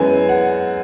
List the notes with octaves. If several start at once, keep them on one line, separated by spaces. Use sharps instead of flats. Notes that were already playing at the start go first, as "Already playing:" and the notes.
Already playing: F#2 E3 G#3 B3 G#5
F#5